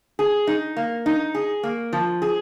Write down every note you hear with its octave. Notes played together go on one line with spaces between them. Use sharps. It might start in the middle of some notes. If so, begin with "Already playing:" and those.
G#4
D#4
A#3
D#4
G#4
A#3
F3
G#4